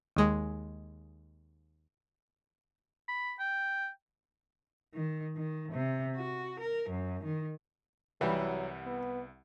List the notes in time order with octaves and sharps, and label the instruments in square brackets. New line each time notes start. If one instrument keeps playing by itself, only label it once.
[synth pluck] D#2 G#3
[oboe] B5
G5
[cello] D#3
D#3
C3
F#4
A#4
F#2
D#3
[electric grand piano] C2 E5 F#5 [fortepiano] E3 G3 [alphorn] F#3
[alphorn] B3